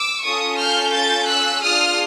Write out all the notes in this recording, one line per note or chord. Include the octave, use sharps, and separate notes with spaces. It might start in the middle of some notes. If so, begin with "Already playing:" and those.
Already playing: D6 E6
C#4 F4 A4 C#6 D#6
F6 G6
G6 A6
E6 F#6
D4 F4 G#4 D#6 F6